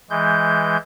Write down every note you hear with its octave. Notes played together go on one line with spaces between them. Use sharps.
E3 G#3 G6